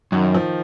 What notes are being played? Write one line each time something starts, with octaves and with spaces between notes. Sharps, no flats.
F#2 D#3
F3